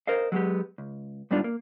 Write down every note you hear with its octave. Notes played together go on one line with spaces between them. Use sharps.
A#4 C5 D#5 F5
F#3 G#3 B3 G4
C#2
G#2 G3 B3 D4 F4
A#3